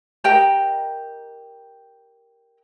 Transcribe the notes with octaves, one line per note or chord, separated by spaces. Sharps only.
G4 A#4 D#5 G5